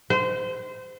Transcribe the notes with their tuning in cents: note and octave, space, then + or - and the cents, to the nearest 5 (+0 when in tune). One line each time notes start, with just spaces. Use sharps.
C5 -25